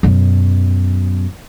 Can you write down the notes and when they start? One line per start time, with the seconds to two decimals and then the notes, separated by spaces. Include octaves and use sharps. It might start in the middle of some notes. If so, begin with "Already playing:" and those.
0.03 F#2 B2